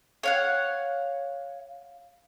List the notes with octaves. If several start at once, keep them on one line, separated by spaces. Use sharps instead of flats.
C#5 F5 F#5